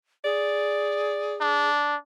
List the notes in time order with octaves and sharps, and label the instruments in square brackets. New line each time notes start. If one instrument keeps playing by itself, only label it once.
[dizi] G#4 [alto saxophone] D5
[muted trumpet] D4